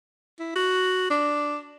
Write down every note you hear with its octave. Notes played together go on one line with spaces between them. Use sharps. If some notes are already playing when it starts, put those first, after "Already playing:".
E4
F#4
D4